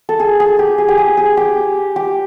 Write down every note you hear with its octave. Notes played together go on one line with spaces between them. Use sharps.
A4
G#4
G#4
G4
G#4
G4
G#4
G#4
G4
G4